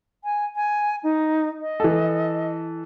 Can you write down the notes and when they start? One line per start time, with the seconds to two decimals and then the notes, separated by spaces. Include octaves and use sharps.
0.24 G#5
0.56 G#5
1.03 D#4
1.60 D#5
1.80 E3 A4